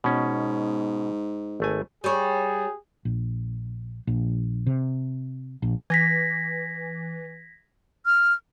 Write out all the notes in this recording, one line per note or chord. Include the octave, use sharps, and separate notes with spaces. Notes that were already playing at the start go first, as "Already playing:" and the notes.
G#2 B2 C#4
G#1 A3 G#5
G3 G#4 C#5
A#1
A#1
C3
A#1
E3 G#6 A#6 B6
F6